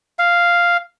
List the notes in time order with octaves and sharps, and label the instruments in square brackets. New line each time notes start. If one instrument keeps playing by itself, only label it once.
[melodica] F5